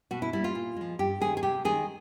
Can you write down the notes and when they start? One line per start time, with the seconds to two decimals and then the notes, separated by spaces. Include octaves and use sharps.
0.11 B2 F#4
0.22 E4
0.33 G3 A#3 E4
0.44 F4
0.55 A#2
0.76 F3 G#3
0.99 G2 G4
1.20 D#3 G#3 G#4
1.37 G#4
1.43 C3 G4
1.65 D#3 G#3 G#4